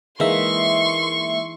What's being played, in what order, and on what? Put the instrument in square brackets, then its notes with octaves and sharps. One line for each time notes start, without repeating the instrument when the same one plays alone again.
[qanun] E3 D#4 [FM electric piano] G#3 A#3 E5 [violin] C6 C#6